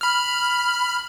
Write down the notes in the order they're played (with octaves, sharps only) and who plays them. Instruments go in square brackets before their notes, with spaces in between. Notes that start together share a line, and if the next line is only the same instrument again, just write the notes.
[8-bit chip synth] B5 F6